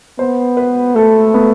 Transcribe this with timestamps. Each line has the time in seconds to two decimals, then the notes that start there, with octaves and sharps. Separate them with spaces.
0.19 B3 C5
0.57 B4
0.95 A3 A4
1.34 B3